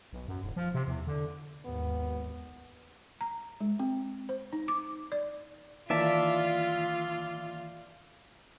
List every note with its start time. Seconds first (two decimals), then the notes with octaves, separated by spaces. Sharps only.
0.13 B1
0.28 F#2
0.44 D#1
0.56 F3
0.74 C3
0.88 E2
1.07 D3
1.66 G#1 D#2 B3
3.21 A#5
3.61 G#3
3.80 C4
4.29 C5
4.53 D#4
4.68 D6
5.12 D5
5.90 D#3 E3 A#3 F4 D5 E5 A5